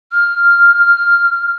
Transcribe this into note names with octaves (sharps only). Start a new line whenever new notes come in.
F6